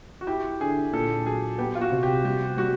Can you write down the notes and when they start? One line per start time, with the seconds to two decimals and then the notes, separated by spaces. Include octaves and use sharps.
0.21 F#4
0.27 E4 G4
0.60 D3 G#4
0.93 A#2 A4
1.26 F#3 G#4
1.58 B3 G4
1.75 F4
1.81 F#4
1.92 C3
2.03 G4
2.25 G3 G4
2.57 G3 F#4